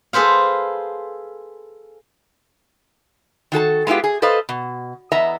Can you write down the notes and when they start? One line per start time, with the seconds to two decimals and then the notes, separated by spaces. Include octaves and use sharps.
0.13 G#4 A4 B4 C5 F5
3.52 D#3 F#4 A4 A5
3.87 G#3 B3 E4 F4 G4
4.04 G#4
4.22 A4 B4 C5 D#5 F5
4.49 B2
5.12 E2 B3 D#5 E5 A#5